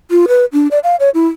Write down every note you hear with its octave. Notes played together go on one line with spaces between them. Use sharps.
F4
B4
D4
D5
F5
C#5
E4